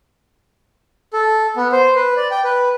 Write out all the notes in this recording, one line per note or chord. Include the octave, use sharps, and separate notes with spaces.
A4
B3
C5
B4
D5
G5
B4